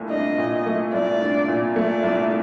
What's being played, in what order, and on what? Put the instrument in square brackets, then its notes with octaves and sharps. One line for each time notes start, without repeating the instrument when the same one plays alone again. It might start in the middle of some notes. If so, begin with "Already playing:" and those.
Already playing: [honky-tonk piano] C2 A#2 A3
[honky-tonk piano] D4 [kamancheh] D#5
[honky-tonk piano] A#2
A3
[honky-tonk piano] C2 [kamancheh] D5
[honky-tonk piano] D4
A#2
[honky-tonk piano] A3 [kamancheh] D5
[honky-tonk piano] C2